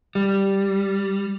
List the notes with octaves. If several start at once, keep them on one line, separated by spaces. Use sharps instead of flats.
G3